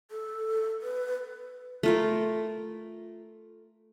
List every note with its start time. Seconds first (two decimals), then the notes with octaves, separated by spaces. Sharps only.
0.11 A4
0.82 B4
1.83 A3 F4 A#4